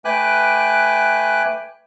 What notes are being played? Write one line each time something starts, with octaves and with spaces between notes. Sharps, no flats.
A3 B4 G5 G#5 D6 F#6